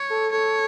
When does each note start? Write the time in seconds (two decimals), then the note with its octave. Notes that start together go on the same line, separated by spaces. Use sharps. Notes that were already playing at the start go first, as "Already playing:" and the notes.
Already playing: C#5
0.10 A4
0.32 A4 C#5